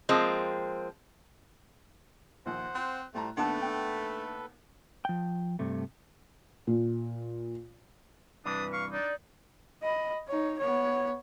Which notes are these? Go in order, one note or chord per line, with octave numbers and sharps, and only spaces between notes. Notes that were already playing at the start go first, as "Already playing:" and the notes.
F3 G#3 A#3 C4
A#1 D#2 C5 F#5
C4 F#6
A2 G3 A3 C5 A5 A#5
D#2 A3 B3 D4 A4 B4 F#5 A5
D4 G5
F3 G5
G2 C3 A3
A#2
G2 C3 E3 D4 B4 D#6
F5 C#6
D4 D#4 D5
D#5 B5
D#4 C#5
B3 C#5